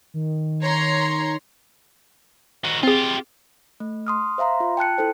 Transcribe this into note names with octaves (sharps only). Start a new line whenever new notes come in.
D#3
C#5 A#5 C6
D#3 F#4
C4 F4 G4 G#4
A3
C6 D#6 F6
C5 E5 F5 A#5 C6
F4
G5 A5 F#6 C#7
E4 A4 C5